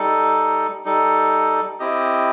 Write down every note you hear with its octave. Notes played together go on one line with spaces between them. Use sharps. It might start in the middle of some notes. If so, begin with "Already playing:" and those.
Already playing: G3 D#4 A4
G3 D#4 A4
C4 E4 G4 D#5